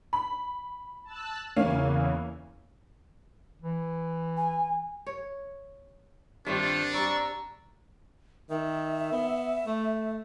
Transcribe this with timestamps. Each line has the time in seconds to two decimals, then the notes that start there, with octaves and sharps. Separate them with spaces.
0.13 B5
1.05 A5 E6 F#6
1.56 E2 C#3 E3 A#3 C#4 F5
3.62 E3
4.37 G#5
5.06 C#5
6.46 G2 D#3 C4 D4 F4 E5
6.94 G3 A#5 C#6 E6 A6
8.50 D#3 E5
9.12 B3
9.66 A3